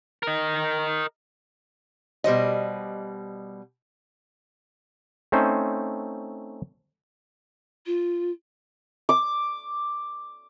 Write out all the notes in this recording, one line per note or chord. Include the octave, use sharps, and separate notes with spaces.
A#4 D#5
B2 G3 C5 D#5
A3 C4 C#4 D#4 C5
F4
D6